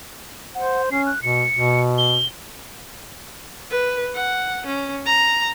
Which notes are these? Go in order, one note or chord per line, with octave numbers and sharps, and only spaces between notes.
C5 F#5
C#4 C7
F#6
B2 C#7
B2
G7
B4
F#5
C#4
A#5